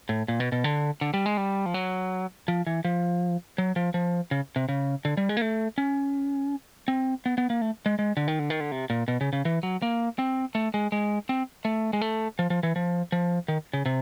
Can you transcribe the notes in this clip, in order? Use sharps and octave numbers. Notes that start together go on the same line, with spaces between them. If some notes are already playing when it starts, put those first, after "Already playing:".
A2
A#2
B2
B2
D3
D3
G3
G#3
G3
F3
F#3
F3
E3
F3
F#3
F3
F3
C#3
C3
C#3
D3
G3
G#3
A#3
A3
C#4
C4
B3
B3
A#3
A3
G#3
G#3
D3
D#3
D3
D#3
D3
C3
A#2
B2
C#3
C#3
E3
F#3
A#3
C4
A3
G#3
G#3
C4
A3
G#3
A3
F3
F3
E3
F3
F3
D#3
C#3
C3